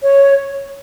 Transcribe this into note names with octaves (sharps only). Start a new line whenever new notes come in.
C#5